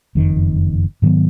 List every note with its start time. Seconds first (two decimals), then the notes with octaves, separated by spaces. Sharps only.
0.15 F#1 F2 D#3
1.02 G#2 D#3 F#3 B3